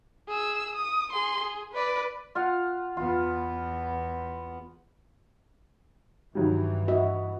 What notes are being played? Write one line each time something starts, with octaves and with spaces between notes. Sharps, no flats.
G#4 E6
D#6
G#4 C6
G#4
B4 D5
F4 F5 F#5
E2 B3 F4
G2 D#3 E3 F#3 G3
F#4 D#5 E5